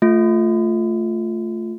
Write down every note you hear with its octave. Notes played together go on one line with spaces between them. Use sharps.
A3 F4